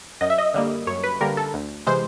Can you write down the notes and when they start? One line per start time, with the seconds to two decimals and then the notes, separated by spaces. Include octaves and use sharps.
0.21 F#2 D#5
0.30 E5
0.38 D#5
0.54 D3 G3 A#3
0.87 F#2 C#5
1.04 B4
1.21 D3 G3 A#3 A#4
1.37 A4
1.54 D2
1.86 C3 E3 G#3 C5